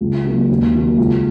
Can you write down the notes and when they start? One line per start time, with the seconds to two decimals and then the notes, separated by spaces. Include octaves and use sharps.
0.01 C#2
0.24 C#3 F#3 A#3
0.50 D#2
0.74 D#3 F#3 A#3
0.98 C#2